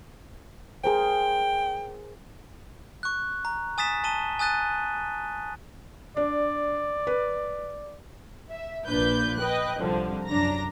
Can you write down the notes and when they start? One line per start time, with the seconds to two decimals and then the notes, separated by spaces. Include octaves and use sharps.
0.84 G#4 A#4 C5 G5
3.03 C#6 F#6
3.45 A#5
3.78 G#5 D#6 A6 B6 E7
4.04 A5 D#7 G7
4.39 G#5 D#6 F#6 A6 D#7
6.17 D4 D5
7.07 B4
8.50 E5
8.88 A#1 A#2 D4 B4 G6
9.38 B4 D#5 G5 F#6
9.80 C2 D3 F3
10.28 F#2 D4 A#5 A#6